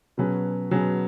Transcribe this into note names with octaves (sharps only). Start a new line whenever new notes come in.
B2 F#3 C#4 G#4 B4
B2 F#3 C#4 G#4 B4